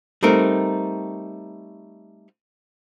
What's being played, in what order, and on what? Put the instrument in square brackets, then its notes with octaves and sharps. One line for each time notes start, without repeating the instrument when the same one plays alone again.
[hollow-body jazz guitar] G3 A3 C4 D#4 A#4